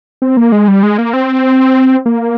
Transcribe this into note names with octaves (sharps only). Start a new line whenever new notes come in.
C4
A#3
G#3
G3
G#3
A#3
C4
A#3